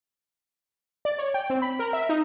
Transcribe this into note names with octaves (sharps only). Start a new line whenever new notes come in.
D5
C#5
G5
C4
B5
A#4
E5
D#4